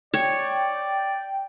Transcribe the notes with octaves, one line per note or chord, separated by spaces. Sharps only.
C#5 D5 G5